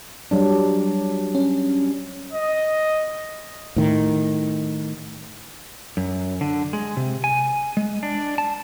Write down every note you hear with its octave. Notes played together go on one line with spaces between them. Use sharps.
F#3 G3 D4
C#4
D#5
A2 D#3
F#2
D3
G#3
C3
G#5
G#3
D4
A5